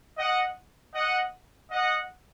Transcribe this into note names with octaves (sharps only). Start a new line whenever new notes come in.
D#5 F#5
D#5 F#5
D#5 F#5